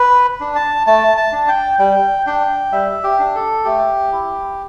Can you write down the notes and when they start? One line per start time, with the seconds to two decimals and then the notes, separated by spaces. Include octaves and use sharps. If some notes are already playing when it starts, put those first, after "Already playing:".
Already playing: B4
0.41 D4
0.56 A5
0.87 A3 A5
1.17 A5
1.33 D4
1.48 G5
1.79 G3 G5
2.27 D4 G5
2.72 G3 E5
3.04 G4
3.19 D4
3.35 A4
3.65 A3 G4
4.12 E4